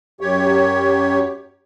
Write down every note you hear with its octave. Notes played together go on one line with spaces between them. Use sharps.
F#2 G4 C#5